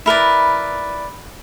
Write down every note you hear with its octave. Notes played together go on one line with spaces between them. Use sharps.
E4 A#4 B4 D5